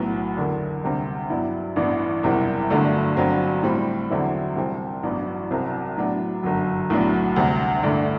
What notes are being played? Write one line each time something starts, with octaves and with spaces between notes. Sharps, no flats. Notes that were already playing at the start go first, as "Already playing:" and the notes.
Already playing: B1 A2 F#3 B3
F#1 E2 D3
D2 C3 G3 D4
G2 F#3 B3 E4
A1 G2 E3 B3 D4
F#1 E2 C3 E3 G3
G1 G2 D3 F#3 A3
G1 G2 F#3 C4
A2 G3 C4
E2 D3 F#3 C4 E4
C2 C3 G3 C4
A1 G2 F#3 B3
C2 C3 F#3 C4
A2 F#3 B3 D4
G1 F#2 F#3
B1 A2 F#3 B3 D4
D2 C3 G3
A1 G2 D3 A3